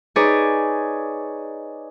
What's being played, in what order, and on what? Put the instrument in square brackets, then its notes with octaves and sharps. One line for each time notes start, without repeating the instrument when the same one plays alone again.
[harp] D#4 G#4 B4 C#5 D5